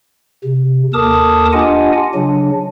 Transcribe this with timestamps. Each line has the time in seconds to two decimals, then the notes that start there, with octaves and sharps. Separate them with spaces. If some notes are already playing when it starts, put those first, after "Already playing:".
0.44 C3
0.94 D#2 A4 A#4 A5 D6 D#6
1.53 D4 F4 G4 D#5 F#5 G#5
2.14 C#3 F#3 D4